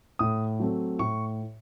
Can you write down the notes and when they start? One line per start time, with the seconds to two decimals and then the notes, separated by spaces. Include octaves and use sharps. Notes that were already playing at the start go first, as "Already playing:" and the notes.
0.19 A2 D#6
0.60 F#3 A3 C4
0.99 A2 C#6